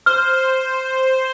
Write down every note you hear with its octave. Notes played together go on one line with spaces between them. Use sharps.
C5 F6